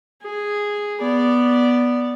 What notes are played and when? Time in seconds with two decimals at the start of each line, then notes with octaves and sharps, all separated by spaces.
0.23 G#4
1.01 B3 D5